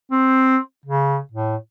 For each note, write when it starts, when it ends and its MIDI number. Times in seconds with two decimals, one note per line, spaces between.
0.11 0.57 60
0.86 1.18 49
1.32 1.56 45